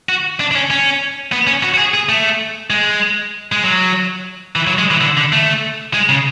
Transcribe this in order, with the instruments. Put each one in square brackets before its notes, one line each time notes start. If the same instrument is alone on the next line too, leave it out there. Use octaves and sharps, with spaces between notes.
[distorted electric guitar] F#4
D4
D4
C#4
C#4
B3
C#4
F#4
F#4
G#4
G#4
A3
G#3
G#3
F#3
E3
F#3
G#3
E3
D3
D3
A3
G#3
C#3